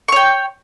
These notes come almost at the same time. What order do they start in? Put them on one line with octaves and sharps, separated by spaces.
C#6 C#5 G5